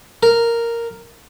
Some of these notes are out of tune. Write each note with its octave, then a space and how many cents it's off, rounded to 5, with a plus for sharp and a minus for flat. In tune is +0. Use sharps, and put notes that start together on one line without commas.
A#4 -5